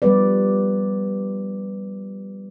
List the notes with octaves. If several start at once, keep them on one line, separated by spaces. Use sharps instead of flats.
F3 G3 B3 B4 D5